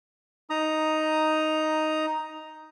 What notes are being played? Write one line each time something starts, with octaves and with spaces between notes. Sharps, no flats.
D#4 A#5 D#6